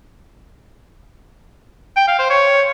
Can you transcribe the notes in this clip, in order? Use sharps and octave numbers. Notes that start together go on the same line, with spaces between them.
G5
F5
C5
C#5